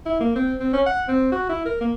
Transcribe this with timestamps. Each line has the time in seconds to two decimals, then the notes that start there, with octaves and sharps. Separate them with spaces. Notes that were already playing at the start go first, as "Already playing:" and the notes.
0.06 E4
0.20 A#3
0.36 C4
0.60 C4
0.73 C#4
0.86 F#5
1.08 C4
1.32 F#4
1.49 E4
1.65 A#4
1.81 A#3